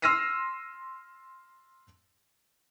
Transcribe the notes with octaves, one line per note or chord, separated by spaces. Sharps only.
C6 E6 F6 A#6 C7 D#7